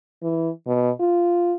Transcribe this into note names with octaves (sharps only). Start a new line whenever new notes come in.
E3
B2
F4